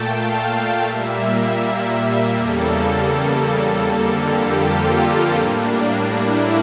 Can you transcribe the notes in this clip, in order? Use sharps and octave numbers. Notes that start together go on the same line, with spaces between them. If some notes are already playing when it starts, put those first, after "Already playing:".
Already playing: A#2 A3 G5 A5
F5
A#2 G3 A#3 E5
E5
E5
E2 C#3 G3 A#3 A4
A4
F2 D3 G3 A#3
G4
F4
A2 G3 A#3 D4
E4